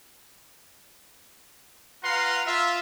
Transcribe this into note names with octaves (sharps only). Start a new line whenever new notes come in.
F4 B4 F5 F#5 A#5 C6
F4 E5